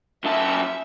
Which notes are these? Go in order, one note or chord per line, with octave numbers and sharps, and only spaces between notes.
F#2 E5 A5